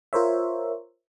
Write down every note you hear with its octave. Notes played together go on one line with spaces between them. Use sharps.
F4 A#4 C5 C#5 E5